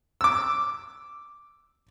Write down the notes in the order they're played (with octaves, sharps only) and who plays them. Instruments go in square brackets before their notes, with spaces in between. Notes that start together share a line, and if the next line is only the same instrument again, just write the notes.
[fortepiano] D6 E6